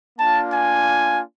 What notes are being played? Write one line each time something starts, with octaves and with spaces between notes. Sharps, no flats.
A#3 D4 F4 A5
G#5